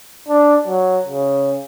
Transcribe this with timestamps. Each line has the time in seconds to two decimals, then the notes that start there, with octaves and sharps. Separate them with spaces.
0.28 D4
0.67 F#3
1.05 C#3